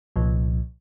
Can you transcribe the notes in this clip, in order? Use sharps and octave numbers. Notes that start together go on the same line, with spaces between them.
C2 A#2 F3